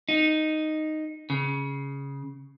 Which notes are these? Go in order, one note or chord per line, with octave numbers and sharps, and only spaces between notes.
D#4
C#3